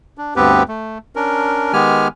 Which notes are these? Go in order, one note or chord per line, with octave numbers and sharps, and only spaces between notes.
D4
D2 G2 B3 C4 G4 B4
A3
C#4 D4 A#4
D#3 G#3 B3 G4 G#5 F6